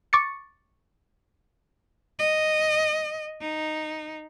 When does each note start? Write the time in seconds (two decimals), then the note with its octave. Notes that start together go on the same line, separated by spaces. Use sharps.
0.13 C#6 D6 A6 C#7
2.19 D#5
3.42 D#4